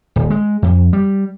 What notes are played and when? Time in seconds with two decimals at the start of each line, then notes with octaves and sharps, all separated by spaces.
0.16 D#1
0.30 G#3
0.63 F2
0.93 G3